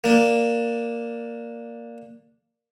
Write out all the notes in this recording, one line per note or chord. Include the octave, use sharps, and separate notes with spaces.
A#3 D4